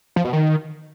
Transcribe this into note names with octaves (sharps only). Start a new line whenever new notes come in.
F3
B2
D#3